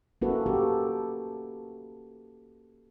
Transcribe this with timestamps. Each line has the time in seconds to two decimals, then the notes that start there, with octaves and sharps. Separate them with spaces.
0.22 A#3 C#4 E4 F#4 A4 B4
0.46 F#4 G4 A4